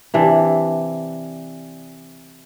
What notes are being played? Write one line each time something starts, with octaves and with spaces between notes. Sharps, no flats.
C3 E3 D4